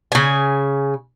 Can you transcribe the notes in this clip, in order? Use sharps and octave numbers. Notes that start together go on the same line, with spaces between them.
C#3 G#5